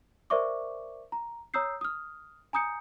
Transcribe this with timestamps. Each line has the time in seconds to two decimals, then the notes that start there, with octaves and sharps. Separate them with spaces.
0.30 A#4 C5 D5 E5 C#6 D6
1.12 A#5
1.54 C#5 A#5 D#6 E6 G6 C7
1.81 D#6 F6
2.53 G#5 A#5 D#6 G6 C#7